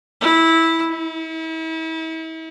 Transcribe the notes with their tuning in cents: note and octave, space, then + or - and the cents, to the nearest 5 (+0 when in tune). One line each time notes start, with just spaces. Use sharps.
E4 -10
E4 -40